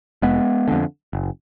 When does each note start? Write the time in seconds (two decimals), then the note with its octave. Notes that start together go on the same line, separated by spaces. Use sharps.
0.22 F1 G#3 B3
0.68 F2 D3
1.13 F#1